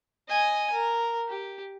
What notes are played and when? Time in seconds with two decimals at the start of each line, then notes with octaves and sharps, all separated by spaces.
0.29 D#5 G#5
0.73 A#4
1.29 G4